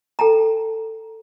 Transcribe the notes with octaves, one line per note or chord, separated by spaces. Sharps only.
A4 G5 A5 A#5